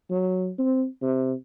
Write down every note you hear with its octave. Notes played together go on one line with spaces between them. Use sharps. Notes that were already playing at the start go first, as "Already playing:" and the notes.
F#3
C4
C3